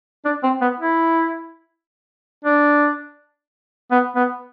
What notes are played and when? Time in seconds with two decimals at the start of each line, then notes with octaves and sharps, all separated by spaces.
0.25 D4
0.43 C4
0.61 B3
0.80 E4
2.45 D4
3.91 B3
4.16 B3